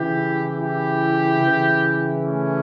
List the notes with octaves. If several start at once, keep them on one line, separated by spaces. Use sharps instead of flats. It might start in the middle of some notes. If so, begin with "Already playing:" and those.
Already playing: C#3 E3 E4 G4
E4 G4
C#3 E3
A3 C#4